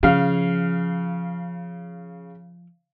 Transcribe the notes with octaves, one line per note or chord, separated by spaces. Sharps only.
C#3 F3 F5